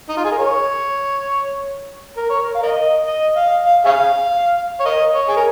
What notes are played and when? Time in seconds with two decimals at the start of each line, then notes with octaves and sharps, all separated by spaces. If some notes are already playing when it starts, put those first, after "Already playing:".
0.09 D#4
0.17 F4
0.25 G#4
0.32 A#4
0.39 C#5
2.17 A#4
2.30 C#5
2.43 A#4
2.55 F5
2.63 A#4 D#5
3.07 D#5
3.37 F5
3.66 F5
3.86 G#4 C#5 F5
4.81 C#5
4.85 A#4 D#5
5.15 C#5
5.29 G#4
5.36 A#4